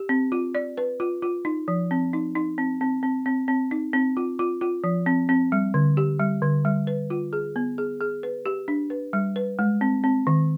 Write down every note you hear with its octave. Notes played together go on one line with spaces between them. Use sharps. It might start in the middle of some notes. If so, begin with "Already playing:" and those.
Already playing: G4
C4
F4
D5
B4
F4
F4
D#4
F3
C4
D#4
D#4
C4
C4
C4
C4
C4
D#4
C4
F4
F4
F4
F3
C4
C4
G3
D3
G4
G3
D3
G3
B4
F4
G#4
B3
G#4
G#4
B4
G4
D4
B4
G3
B4
G#3
C4
C4
D#3